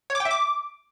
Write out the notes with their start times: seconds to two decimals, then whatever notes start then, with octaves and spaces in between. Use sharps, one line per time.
0.10 C#5
0.15 D6
0.20 G5
0.25 E5
0.31 D6